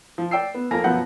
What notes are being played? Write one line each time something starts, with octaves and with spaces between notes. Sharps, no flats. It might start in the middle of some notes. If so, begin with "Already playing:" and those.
F3
D5 G5 E6 C7
B3
F2 A#3 A4 A#4 G#5 A#6
F#2 B2 F3 B3 F#5 G6